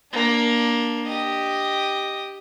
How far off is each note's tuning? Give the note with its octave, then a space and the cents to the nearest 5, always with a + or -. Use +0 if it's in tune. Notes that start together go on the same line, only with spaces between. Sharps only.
A#3 +15 D4 +0
G4 +0 D#5 +0